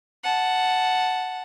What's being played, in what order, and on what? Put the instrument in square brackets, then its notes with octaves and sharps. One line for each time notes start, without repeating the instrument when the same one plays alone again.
[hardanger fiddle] F#5 A5